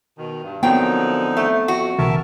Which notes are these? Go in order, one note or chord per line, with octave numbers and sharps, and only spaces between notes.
B2 D#3
G2
A#2 D3 F3 F#3 B3 C4 D#4 G5
A3
F2 F#4
B1 C#3 E3 A#4 E5 A5